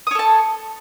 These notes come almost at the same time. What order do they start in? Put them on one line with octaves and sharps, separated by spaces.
D#6 C#5 A4 A5